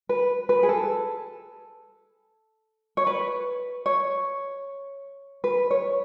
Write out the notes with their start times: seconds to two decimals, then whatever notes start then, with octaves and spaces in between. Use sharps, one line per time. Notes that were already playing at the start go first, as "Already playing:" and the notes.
0.09 B4
0.49 B4
0.63 G#4
0.69 A4
2.97 C#5
3.07 B4
3.86 C#5
5.44 B4
5.71 C#5